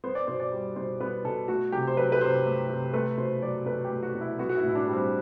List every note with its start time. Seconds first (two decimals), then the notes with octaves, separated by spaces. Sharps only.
0.04 B3 C5
0.15 D5
0.27 B2 C5
0.40 D5
0.52 G3
0.76 B2 C5
1.00 B3 B4
1.25 B2 A4
1.48 A3 F#4
1.72 C3 G4
1.87 C5
1.97 F#3 B4
2.12 B4
2.21 C3 C5
2.46 A3
2.69 C3
2.93 A3 B4
3.18 B2 C5
3.42 F#3 D5
3.66 B2 B4
3.84 G4
3.91 A3
4.03 F#4
4.15 B2
4.21 E4
4.39 B3 F#4
4.49 F#4
4.57 E4
4.63 A2
4.69 E4
4.75 D4
4.87 G3
4.93 C4